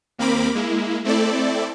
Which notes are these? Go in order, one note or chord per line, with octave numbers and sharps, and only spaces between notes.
D#2 A#3 C4 A#4 B5 D6
G#3 A#3 E4
A3 C4 E4 A4 D5